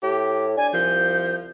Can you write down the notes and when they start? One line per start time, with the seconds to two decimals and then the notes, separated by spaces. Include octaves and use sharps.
0.03 A2 G4
0.57 D4 G#5
0.73 C2 F3 G6